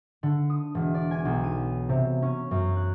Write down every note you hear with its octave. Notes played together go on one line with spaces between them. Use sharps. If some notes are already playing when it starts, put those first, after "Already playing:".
D3
D#6
E1
D5
G#5
B1
D#7
C3
C#4
F#2
F#6